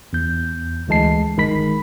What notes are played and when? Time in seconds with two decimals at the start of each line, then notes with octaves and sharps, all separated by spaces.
0.13 E2 G6
0.88 D2 E3 G#3 A5 C7
1.37 G1 D#3 G#3 B5 B6